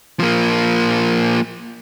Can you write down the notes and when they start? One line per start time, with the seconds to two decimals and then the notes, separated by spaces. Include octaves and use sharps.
0.20 F3 A#3